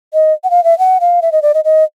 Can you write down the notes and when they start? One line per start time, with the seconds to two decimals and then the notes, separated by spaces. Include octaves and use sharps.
0.14 D#5
0.44 F#5
0.50 F5
0.64 E5
0.79 F#5
1.01 F5
1.22 E5
1.32 D#5
1.42 D5
1.54 D#5
1.65 D#5